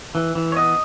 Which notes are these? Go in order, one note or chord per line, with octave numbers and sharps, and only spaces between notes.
E3
E3
C#5
B3 D#5